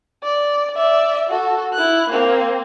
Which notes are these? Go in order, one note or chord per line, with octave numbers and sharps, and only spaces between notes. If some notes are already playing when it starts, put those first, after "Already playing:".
D5
D5 E5
F#4 A4
E4 F#6
A#3 C4